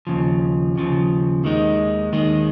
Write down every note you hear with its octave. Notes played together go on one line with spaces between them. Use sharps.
D#2 C#3 F3
D#2 C#3 F3
D#2 D#3 G#3 D#4
D#2 D#3 G#3 D#4